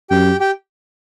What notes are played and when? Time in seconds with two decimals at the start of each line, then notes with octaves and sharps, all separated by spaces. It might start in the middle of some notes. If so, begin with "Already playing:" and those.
0.10 F#2 G4 G5
0.40 G4 G5